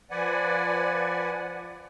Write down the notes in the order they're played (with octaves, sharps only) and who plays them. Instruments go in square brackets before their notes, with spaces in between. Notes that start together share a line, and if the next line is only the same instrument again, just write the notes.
[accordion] F3 B4 D5 F#5 G#5